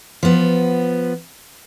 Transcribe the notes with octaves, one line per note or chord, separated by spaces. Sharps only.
F3 B3